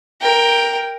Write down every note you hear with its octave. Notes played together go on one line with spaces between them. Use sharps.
A#4 G5